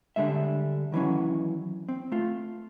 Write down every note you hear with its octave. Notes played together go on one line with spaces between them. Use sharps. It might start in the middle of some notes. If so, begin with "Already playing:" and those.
D3 G3 G#3 E5
D#3 E3 F#3 C#4
C4
A3 F4